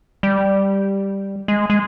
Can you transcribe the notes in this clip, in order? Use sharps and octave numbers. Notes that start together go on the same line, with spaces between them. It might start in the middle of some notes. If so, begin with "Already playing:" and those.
G3
G#3
G#3